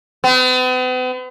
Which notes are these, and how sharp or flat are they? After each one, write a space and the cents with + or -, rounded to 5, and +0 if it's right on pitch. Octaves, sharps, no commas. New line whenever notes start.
B3 +45